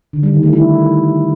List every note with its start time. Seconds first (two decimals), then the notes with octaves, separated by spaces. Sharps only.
0.13 D3
0.23 G3
0.33 D#3
0.43 A3
0.53 E4